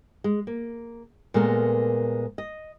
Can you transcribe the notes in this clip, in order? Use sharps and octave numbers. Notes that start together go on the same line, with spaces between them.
G#3
A#3
A#2 G#3 A3 B3 A#4
D#5